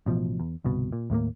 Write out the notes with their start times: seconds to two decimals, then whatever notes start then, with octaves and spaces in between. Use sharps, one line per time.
0.06 A1 B2 F3
0.40 E2
0.64 G1 C2 B2
0.93 A#2
1.10 D#2 A2 A3 A#3